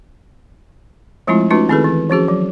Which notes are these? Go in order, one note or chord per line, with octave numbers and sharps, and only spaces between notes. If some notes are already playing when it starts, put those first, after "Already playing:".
F3 G#3 A3 C4 E4 F4
A3 C#4 D#4 F4 F#4 B4
D#3 C4 E4 G#4 A4 B4
E3
F3 C#4 F#4 G#4
F#3